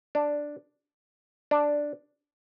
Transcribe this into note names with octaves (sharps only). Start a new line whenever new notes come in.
D4
D4